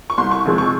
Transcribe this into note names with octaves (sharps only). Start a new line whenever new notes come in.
C#6
C2 C6
C#6
C3 F3 G#3
C#6